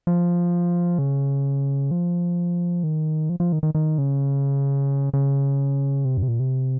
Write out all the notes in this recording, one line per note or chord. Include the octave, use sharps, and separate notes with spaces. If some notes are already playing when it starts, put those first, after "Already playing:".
F3
C#3
F3
D#3
F3
F3
D#3
D#3
D#3
C#3
C#3
C3
F#2
C3
A#2
C3